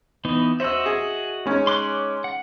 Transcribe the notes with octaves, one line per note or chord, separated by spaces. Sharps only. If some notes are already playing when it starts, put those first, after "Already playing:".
E3 B3 D#4
F#4 C5 D#5 E5 E6
G#4
G#3 C#4 D#4
C6 D6 F#6
F#5